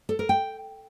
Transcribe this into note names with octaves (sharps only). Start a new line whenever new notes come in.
A4
A#4
G5